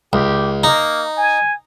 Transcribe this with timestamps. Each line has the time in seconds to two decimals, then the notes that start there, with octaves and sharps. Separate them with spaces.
0.13 C#2 G4
0.64 A#3 D#4
1.17 G#5